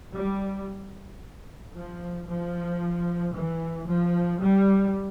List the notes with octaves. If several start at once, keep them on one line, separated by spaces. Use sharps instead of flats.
G3
F3
F3
E3
F3
G3